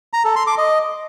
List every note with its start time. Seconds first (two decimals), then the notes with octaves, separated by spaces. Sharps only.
0.13 A#5
0.25 A4
0.36 C6
0.47 D6
0.58 D#5